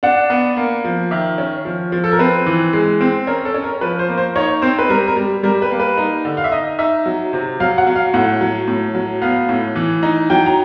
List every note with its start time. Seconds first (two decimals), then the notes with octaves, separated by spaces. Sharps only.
0.03 D4 F#5
0.30 B3
0.57 A#3
0.84 F3
1.11 D#3 E5
1.38 C#4
1.65 F3
1.92 F3
2.04 A4
2.12 A#4
2.19 C4 B4
2.46 E3
2.73 G#3
3.01 C4
3.27 C#4 A#4
3.45 A4
3.54 C#4
3.64 A#4
3.81 F3 B4
3.99 C5
4.08 A#3
4.18 C5
4.35 D#4 C#5
4.62 C4 C5
4.79 B4
4.89 G3 A#4
5.08 A#4
5.17 G3
5.43 G3 A#4
5.62 B4
5.71 A#3
5.80 B4
5.98 D#4
6.25 D3
6.37 F5
6.44 E5
6.52 D#4 D#5
6.79 D#4 E5
7.06 F#3
7.33 C3
7.60 F#3 F5
7.78 F#5
7.87 F#3
7.96 F5
8.14 A2 F#5
8.41 F#3
8.68 A2
8.95 F#3
9.22 B3 F5
9.49 A2
9.76 E3
10.03 D#4
10.30 F#3 G5
10.46 A#5